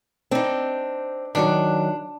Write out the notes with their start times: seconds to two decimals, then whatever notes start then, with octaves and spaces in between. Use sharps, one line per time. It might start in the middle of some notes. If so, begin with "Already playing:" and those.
0.31 C4 D4 D#4
1.35 D#3 F3 F#3 D4